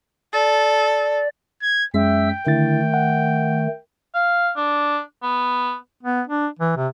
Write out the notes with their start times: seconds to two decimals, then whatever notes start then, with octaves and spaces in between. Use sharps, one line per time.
0.33 A4 D5
1.62 G#6
1.94 F#2 G#3 C#4 E5 G5 E6
2.47 D3 D#3 A3 E4 A6
2.94 F#5
4.14 F5
4.56 D4
5.23 B3
6.03 B3
6.27 D4
6.59 E3
6.77 C3